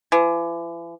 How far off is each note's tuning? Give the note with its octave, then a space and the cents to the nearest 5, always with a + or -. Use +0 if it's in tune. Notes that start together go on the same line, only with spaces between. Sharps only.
E3 +40